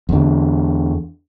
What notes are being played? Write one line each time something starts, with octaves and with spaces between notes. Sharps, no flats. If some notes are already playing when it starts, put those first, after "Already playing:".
E2 D3